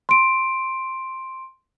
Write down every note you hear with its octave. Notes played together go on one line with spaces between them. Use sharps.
C6 D7